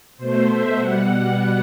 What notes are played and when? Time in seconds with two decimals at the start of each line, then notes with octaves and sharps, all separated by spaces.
0.18 B2 A3 C5
0.46 E5
0.76 B2 G3 F#5
1.06 F#5